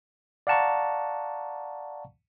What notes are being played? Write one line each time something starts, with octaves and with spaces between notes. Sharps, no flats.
D5 F5 F#5 A5 A#5 C#6